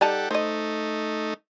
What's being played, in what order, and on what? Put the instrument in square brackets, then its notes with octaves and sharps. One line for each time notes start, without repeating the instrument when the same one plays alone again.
[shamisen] G3 D#4 A5 [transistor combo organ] G4 A4 F#5
[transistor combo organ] A3 D#4 [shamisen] C5 D#5